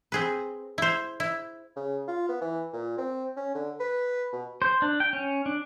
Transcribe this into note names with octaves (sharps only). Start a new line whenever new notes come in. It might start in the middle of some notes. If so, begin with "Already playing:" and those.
C4 G#4 B4
E4 C5
E4
C#3
F4
B3
E3
A#2
C4
C#4
D3
B4
B2
C5
D4
G5
C#4
D4